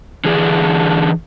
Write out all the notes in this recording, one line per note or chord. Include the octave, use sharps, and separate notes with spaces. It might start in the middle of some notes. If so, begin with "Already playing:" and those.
D3 E3 D4 G#4